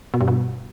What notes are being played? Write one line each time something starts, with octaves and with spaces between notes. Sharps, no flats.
B2
G2
B2